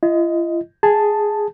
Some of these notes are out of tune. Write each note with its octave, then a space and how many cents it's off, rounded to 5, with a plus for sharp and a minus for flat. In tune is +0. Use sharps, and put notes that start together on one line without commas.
F4 -45 D#5 +10
G#4 +0 A5 +0